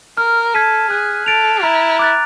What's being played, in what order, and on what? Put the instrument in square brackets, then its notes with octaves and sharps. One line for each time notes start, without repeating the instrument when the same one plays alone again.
[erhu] A#4 [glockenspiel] F6
[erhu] A4 [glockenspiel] G#6 B6 D#7
[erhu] G#4 [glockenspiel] F#6
[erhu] A4 [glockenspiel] A6 D7 F7
[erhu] E4 [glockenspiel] A#5
[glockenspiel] D6 F#6 A6